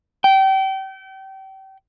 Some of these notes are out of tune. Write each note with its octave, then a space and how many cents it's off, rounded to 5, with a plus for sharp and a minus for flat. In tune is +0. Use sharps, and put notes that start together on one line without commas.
G5 -30